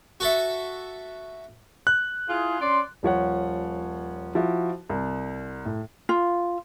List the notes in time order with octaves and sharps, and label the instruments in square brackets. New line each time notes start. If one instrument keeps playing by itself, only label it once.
[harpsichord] F#4 A4 E5
[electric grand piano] F#6
[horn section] E4 F4 G#4
C#4 D5 C6
[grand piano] D#1 F3 C#5 F#5
F3 E4 F#4
C2
A2
[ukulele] F4